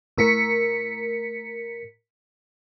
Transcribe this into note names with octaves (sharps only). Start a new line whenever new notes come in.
A2 A#4 B6 C#7